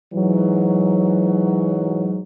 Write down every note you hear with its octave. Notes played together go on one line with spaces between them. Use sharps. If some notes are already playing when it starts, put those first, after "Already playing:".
G#2 E3 F#3